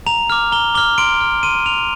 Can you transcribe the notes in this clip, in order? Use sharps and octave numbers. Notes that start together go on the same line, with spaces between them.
A#5 F7
D6 F6
A#5 G7
D6 F6 G7
C6 D7
F6
C6 D#7
F6 F7